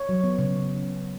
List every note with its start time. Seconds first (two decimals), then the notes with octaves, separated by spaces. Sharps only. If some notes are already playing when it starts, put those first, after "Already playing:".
Already playing: C#5
0.09 F#3
0.24 B3
0.39 C#3